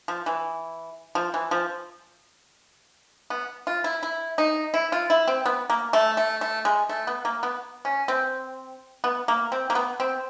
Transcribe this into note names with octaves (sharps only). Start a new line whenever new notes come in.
F3
E3
F3
E3
F3
B3
F4
E4
E4
D#4
E4
F4
E4
C4
B3
A#3
A3
A3
A3
G#3
A3
B3
A#3
B3
C#4
C4
B3
A#3
C4
A#3
B3
C4